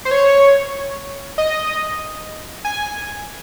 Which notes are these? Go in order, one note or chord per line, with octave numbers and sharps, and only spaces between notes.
C5
C#5
D#5
G#5